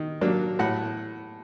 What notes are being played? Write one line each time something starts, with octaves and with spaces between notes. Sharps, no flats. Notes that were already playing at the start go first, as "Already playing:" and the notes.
Already playing: D#3
F#3 A#3 D4
A2 F#5